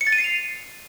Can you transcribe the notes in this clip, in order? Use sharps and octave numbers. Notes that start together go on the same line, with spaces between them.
C#7
A6
D#7
C7
F7